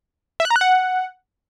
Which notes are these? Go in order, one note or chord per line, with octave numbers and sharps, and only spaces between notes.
E5
F#6
A#5
F#6
F#5